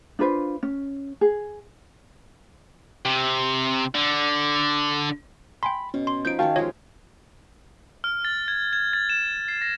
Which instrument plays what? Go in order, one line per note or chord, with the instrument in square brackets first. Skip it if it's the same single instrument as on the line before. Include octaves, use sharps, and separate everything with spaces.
[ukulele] D4 F4 B4 C5
C#4
G#4
[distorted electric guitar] C3
D3
[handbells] G5 G#5 C6 [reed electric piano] B5
[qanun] B2 [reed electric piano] C#4
[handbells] C6
[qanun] F3 D#4 B5 [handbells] G6 D7
[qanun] D#3 C#4 C#5 [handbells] F#4 [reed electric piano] F5 G5 A5
[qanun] F3 G#3 G4 [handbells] F4 C#5 D#5
[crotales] F6
A6
G#6
G#6
A6
E7
C7
A#6